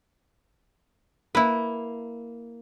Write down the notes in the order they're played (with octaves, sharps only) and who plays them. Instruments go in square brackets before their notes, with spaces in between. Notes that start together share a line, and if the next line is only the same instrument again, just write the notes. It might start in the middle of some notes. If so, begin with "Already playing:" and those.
[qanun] A#3 [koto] E4 B4